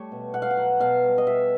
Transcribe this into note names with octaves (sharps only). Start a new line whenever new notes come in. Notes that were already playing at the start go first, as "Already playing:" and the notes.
Already playing: G3 A3 C#5
B2
B2 F#5
F5
F#5
F#3
B2 F5
G3
D#5
B2 E5